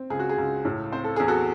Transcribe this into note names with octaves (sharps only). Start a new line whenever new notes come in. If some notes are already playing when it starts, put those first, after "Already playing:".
Already playing: C4
C#2 G#4
F#4
G#4
C#2
A2
C4 C5
A4
E2 G#4
F#4 A4